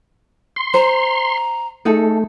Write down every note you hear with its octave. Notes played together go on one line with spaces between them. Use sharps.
C6
C5 A#5
A3 D#4 G#4 A4